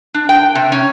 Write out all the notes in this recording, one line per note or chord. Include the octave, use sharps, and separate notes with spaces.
D4
G5
C3
C#4